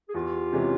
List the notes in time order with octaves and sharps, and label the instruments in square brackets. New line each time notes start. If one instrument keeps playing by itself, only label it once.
[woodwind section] G#4
[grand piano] E2 [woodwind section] F4 G4
[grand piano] C3 E3 G#3 C#4